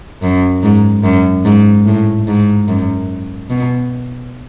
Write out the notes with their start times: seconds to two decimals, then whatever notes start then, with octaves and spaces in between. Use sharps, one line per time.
0.22 F#2
0.63 G#2
1.04 F#2
1.45 G#2
1.86 A2
2.27 G#2
2.68 F#2
3.50 B2